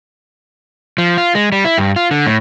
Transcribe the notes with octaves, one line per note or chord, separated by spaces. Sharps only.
F3
F4
G#3
G3
E4
G2
F4
D3
A2